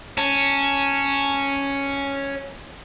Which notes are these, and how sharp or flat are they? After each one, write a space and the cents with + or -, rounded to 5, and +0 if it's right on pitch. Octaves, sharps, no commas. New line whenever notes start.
C#4 +0 A5 +15